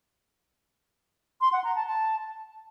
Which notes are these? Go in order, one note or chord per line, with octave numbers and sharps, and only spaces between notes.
C6
F#5
A#5
A5
A5